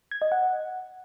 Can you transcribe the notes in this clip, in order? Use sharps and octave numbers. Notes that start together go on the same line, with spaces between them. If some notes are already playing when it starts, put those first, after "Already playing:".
G#6
D#5
F#5